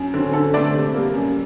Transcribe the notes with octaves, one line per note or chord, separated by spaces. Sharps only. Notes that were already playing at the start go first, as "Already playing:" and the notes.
Already playing: F#2
D3 F#3 C4
D3 A4
A3 C4 D4 D5
C3
G3 A#3
F#2